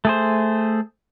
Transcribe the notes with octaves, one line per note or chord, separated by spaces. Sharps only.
A3 G#4 C5